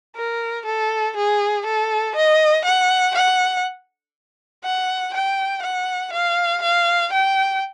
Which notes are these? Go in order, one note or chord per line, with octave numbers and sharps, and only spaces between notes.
A#4
A4
G#4
A4
D#5
F#5
F#5
F#5
G5
F#5
F5
F5
G5